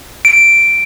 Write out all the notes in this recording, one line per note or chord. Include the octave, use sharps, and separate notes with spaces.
D7